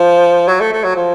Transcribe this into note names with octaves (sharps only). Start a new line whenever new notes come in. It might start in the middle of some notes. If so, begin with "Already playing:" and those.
Already playing: F3
F#3
A3
A3
F#3
F3